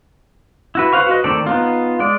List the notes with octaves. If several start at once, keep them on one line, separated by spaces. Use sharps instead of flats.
E4 F#4 B4
B4 C5 F5 C#6
F#4 B4 D#5
D#3 A3 C4 A4 D5
B3 D#4 F4
G#3 D5